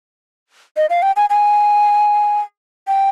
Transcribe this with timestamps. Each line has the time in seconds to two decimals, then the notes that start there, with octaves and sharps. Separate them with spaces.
0.77 D#5
0.90 F5
1.02 G5
1.16 G#5
1.30 G#5
2.88 G5